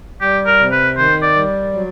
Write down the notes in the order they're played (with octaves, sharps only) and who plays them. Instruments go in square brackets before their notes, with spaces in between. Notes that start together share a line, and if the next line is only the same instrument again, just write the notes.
[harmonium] G3 [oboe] G4
[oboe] A#4
[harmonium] C3
[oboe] B4
[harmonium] D#3 [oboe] C5
[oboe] D5
[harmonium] G3
F#3